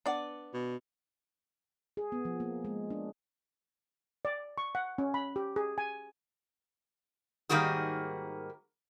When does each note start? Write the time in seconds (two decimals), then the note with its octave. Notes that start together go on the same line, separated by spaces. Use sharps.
0.06 B3 D4 D5 F#5
0.54 B2
1.97 G#4
2.12 B3
2.25 F3
2.40 A#3
2.65 G#3
2.90 D4
4.25 D5
4.58 C#6
4.75 F#5
4.98 C#4
5.14 B5
5.36 G4
5.56 G#4
5.78 G#5
7.49 G#2 D#3 G3 A#3 F#4 G#4